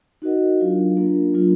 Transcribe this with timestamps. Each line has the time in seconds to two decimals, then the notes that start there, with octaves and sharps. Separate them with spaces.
0.22 D#4 F#4 A#4 D#5 F#5
0.59 F#3 D4 F4 A#4 F5
0.96 A#3 D4 F4 A#4
1.34 F#3 A#3 D4 F4 A#4